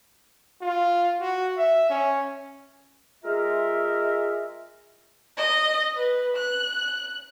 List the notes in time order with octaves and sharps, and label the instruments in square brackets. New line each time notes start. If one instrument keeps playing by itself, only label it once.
[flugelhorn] F4
F#4
E5
C#4
[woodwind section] G#3 F4 A#4 E5
[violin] D#5
B4
F#6